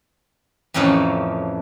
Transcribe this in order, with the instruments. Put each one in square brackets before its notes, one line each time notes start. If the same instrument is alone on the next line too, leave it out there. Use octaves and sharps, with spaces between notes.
[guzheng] F2 A2 C#3 E3 F3 A#3